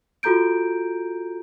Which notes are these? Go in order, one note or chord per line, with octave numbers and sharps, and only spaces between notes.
F4 F#4 A4 A#5 G6 D7